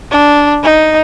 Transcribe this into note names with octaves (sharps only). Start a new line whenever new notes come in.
D4
D#4